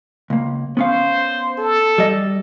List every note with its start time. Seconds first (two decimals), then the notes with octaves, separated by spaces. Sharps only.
0.30 C#2 A#3
0.77 B3 C#4 C5 F5
1.58 A4
1.98 G3 D#5